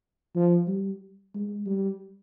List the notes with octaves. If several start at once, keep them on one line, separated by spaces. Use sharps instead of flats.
F3
G3
G#3
G3